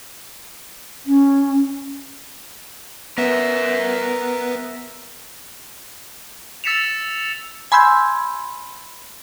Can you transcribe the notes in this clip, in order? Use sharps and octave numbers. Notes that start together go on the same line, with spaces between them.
C#4
B3 A#4 E5
E6 A6 B6 C#7 E7 F7
G#5 B5 C6 E6 G6 G#6